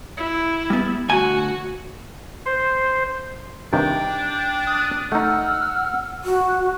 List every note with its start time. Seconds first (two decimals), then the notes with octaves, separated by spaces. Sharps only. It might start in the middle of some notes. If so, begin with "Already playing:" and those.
0.17 E4
0.70 G3 B3
1.09 D2 F#4 G#5
2.46 C5
3.73 G2 C3 D#3 D4 G5
4.67 D#6 F#6
5.12 A3 D#4 F#5 E6 F6
6.25 F#4